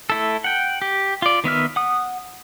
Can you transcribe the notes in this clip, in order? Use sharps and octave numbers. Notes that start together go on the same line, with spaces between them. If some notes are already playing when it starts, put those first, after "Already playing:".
A3 E4 A4
F#5 G5
G4
F4 D5
D#3 B3 E5 F6
F#5 D#6